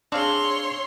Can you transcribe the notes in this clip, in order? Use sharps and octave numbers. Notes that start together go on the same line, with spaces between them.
C4 D4 G#4 C#5 F5 C6